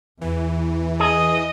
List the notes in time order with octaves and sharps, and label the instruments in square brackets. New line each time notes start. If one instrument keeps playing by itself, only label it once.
[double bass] E2 [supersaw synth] E3
[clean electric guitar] G#4 [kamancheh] D#5